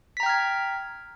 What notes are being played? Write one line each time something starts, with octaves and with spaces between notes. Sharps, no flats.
G5 A#5 F6 G#6 B6